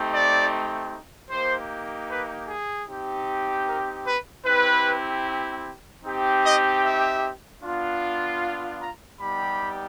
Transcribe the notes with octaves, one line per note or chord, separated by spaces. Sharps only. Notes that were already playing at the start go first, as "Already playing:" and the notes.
Already playing: A3 C4 D#4 G4
D5
A#3 D#4 G4 C5
B4
G#4
C4 D#4 G4
A#4
B4
C4 E4 G4 B4
C4 D#4 G4
D#5
E5
B3 D4 F4
A#5
G3 B3 D#4 G4 B5